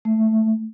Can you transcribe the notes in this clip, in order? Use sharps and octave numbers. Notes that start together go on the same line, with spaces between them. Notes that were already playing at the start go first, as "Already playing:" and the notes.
A3